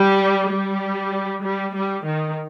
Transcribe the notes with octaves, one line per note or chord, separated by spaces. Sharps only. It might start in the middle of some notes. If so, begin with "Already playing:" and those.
Already playing: G3
G3
G3
G3
D#3